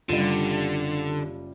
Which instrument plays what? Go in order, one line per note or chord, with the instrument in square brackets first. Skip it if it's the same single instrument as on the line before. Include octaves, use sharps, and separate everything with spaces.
[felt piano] F#1 G3 [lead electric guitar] D3 [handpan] F4 G4